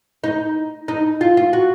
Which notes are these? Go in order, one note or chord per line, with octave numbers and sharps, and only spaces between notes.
D#4
D#4
F4
F4
F#4